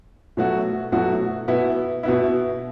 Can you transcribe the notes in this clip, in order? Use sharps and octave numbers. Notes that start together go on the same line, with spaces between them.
B2 F#3 A3 F#4
B2 F#3 A3 F#4
B2 B3 E4
B2 B3 E4